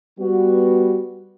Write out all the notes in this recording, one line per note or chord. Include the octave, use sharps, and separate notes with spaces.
G3 B3 F#4